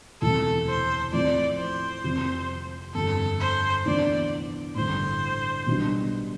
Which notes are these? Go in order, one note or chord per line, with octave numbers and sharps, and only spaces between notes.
E1 D2 C3 E3 A4
C5
A2 F3 C4 E4 D5
C5
F2 C3 F3
G1 F2 D3 A4
C5
D2 C3 E3 B3 D4 D5
A1 G2 D3 C5
B1 B2 G3 D4